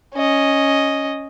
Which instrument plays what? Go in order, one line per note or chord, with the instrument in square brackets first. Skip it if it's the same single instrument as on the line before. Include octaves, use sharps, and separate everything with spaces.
[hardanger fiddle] C#4 D#5